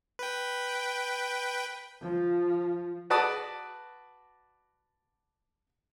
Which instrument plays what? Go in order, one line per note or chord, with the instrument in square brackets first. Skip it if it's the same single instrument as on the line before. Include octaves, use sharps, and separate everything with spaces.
[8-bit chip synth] B4 G5
[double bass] F3
[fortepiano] F#4 B4 D5 A5 D6 D#6